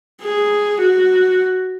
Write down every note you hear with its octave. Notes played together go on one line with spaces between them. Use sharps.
G#4
F#4